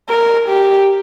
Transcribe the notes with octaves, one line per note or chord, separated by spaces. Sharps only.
A#4
G4